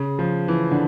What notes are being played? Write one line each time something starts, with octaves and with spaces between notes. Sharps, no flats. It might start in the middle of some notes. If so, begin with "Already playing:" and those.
Already playing: C#3
F3
E3
D3